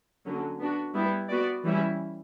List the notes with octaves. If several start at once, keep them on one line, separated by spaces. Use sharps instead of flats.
D3 F#3 A#3 C#4
B3 D4 F#4
G3 B3 E4
B3 F#4 B4 D5
E3 G3 C#4 E4